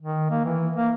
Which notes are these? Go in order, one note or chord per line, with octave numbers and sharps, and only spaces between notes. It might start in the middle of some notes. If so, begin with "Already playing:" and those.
D#3
A#3
E3
A#3